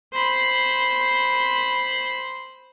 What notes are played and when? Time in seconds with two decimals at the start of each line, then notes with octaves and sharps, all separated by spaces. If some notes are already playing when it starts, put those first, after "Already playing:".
0.13 C5 B5